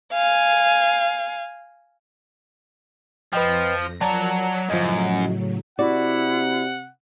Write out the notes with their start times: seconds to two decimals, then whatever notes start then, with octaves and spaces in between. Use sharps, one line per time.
0.13 F5 G#5
3.33 F2 F3 B4 D#5 G5 A#6
4.01 F3 F#3 A#4 D5 A5 A#5
4.38 D6 F#6 B6
4.70 F#2 A2 C#3 F3 F#3 D#5
5.79 C3 E4 F#4 D5 F#5